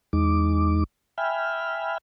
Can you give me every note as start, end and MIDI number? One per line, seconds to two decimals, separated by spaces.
0.13 0.84 40
0.13 0.84 56
0.13 0.84 63
0.13 0.84 86
1.18 1.98 76
1.18 1.98 79
1.18 1.98 80
1.18 1.98 83
1.18 1.98 89